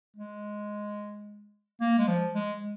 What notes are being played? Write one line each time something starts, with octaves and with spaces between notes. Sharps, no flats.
G#3
A#3
G#3
F3
G#3